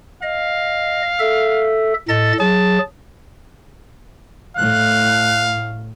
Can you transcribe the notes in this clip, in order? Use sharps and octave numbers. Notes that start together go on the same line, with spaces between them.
D#5 F5
A4 E5
A2 A4 D#5 A6
F#3 G#4 A5
A2 F5 F#6